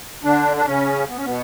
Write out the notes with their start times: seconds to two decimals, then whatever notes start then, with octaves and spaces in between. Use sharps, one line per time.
0.24 D3 D4
0.56 D4
0.66 C#3 C#4
1.09 B3
1.17 C#4
1.25 B2 B3